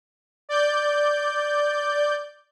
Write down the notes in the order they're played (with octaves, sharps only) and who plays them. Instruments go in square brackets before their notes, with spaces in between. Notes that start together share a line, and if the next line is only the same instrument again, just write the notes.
[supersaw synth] D5 G6